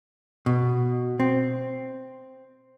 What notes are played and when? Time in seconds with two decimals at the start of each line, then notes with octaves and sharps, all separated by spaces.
0.46 B2
1.20 C4